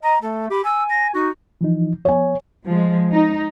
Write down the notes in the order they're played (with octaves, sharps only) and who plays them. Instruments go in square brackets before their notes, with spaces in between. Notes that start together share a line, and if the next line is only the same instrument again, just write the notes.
[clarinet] D#5 [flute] A#5
[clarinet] A3 [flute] A4
[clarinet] G4 [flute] B5
[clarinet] G#5 [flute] E6
[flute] A#6
[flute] D#4 [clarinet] F#4
[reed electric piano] E3 F3 D#4
[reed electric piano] F3 B3 [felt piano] C#5 G#5
[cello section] F3 G#3
D#4